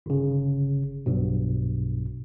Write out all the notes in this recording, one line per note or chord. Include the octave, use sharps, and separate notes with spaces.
G1 C#3
B1 G2 B2